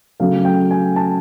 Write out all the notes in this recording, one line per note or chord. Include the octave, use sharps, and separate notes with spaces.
C#3 F#3 A3 F5
G5
G#5
A5